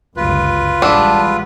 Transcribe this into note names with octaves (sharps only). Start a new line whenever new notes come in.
G1 C#2 F#2 F4 B4
A1 G3 G#3 D4 F#5 B5 E6